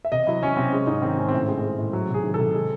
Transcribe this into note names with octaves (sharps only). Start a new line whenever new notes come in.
E5
C3 D#5
F#3 E4
F#3 C#4
C3 C4
G#3 C#4
G#2 D#4
D#3 C4
G#2 C#4
C4
A2
G#3 C4
G#3
A2
F#3
C3
G#4
D#3
C3 A4
G#3